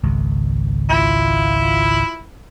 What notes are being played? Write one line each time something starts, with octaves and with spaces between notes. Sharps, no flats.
G#1 C#2
E4 F4